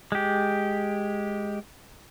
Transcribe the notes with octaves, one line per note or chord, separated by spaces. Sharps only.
G#3 G4